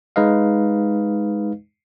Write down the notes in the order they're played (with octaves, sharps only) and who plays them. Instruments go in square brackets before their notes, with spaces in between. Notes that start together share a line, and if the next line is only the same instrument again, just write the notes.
[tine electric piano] G#3 D#4 B4 D#5 F5